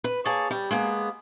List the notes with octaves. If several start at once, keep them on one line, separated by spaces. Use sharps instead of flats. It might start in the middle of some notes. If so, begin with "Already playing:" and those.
B4
A#3 G#4 C#5 A5
G3
G#3 A#3 B3